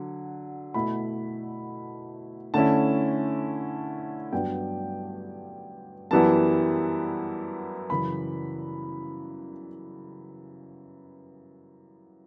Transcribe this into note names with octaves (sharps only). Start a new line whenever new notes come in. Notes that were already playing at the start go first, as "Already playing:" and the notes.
Already playing: D3 F#3
B2 A3 E4 B5
D3 A3 C#4 E4 A5
G2 F#3 B3 D4 G5
F#2 E3 G3 B3 E4 A5
F#2 C#3 E3 B5